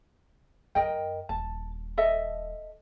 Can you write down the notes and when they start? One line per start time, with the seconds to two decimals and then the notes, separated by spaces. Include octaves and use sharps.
0.75 F#2 A#4 D#5 G5
1.29 D#1 A5
1.97 A4 D#5 E5